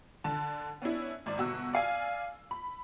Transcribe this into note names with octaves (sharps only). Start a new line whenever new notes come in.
D3 A5
B3 C#4 D4 E4
G#1 D5
G1 B2 F#4 E6
D5 F5 G#5
B5